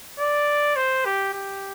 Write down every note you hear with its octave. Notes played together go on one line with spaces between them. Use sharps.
D5
C5
G4
G4